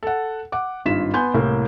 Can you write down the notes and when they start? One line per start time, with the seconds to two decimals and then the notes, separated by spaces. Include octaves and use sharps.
0.03 A4 F#5
0.52 F#5 D6
0.86 G#1 G2 F4 B6 E7
1.14 B3 G#5 C6 G6
1.34 C2 A2 A#3